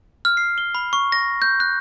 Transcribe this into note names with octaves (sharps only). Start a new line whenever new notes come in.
F6
C7
G7
B5
C#6
A#6
G6
F#6